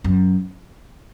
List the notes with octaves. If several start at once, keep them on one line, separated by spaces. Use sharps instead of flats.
F#2